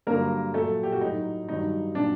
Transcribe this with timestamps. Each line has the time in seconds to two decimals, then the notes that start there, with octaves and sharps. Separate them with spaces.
0.07 G2 D3 F#3 A#3 A#4
0.54 A#2 F#3 A3 A4
0.83 G4
0.92 F#4
1.01 A2 F#3 D#4
1.48 G2 D#3 F#3 D#4
1.95 A#2 F#3 D4